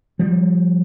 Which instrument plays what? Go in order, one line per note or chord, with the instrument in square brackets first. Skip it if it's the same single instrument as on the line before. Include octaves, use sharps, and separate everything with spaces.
[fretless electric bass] F3 G3